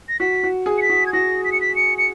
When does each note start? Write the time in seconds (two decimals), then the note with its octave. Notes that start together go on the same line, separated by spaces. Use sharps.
0.09 A#6
0.20 F#4 B6
0.44 F#4
0.66 G#4
0.78 C#7
0.82 B6
0.90 F#4
1.06 G#6
1.13 F#4 A#6
1.45 B6
1.52 C#7
1.61 B6
1.76 C#7
1.98 C#7